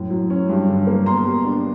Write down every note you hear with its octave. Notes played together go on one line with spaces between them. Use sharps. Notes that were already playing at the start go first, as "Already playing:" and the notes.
Already playing: F#2 A2
F#3
C#4
G2
D3
A#3
B2 A#5 C6
G3
D4